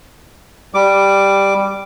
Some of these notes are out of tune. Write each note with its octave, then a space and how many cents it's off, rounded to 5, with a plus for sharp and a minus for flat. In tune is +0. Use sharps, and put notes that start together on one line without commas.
G3 +5 D6 +0